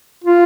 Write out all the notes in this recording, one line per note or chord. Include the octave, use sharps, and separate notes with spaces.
F4